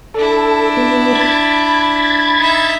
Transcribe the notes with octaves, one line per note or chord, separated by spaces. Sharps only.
D4 E4 A4
B3
B5 G#6 A6
D#4 E5